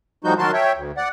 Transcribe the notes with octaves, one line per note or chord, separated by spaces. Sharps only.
A2 F3 G3 D#4 F#4 G6
D#3 F#3 F#4 A#4 A5 C6
C#5 E5 G5
D2
D5 F#5